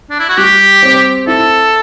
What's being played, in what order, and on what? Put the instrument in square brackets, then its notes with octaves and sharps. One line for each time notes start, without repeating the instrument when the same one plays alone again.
[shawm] D4
E4
F#4
[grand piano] G3 [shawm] G4
[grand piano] C4
[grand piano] E4 [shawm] A4